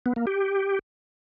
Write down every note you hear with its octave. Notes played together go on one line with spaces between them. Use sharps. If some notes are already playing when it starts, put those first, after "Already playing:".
B3
A#3
G4